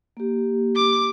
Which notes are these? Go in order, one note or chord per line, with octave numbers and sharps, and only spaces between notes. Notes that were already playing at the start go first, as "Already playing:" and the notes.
A#3 G4
D6